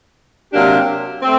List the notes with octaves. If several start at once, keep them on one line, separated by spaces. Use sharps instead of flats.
C3 F#3 A#3 D4 G4
A3 C4